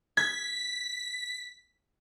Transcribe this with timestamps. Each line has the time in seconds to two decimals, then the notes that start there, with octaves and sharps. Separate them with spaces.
0.17 G#6 B6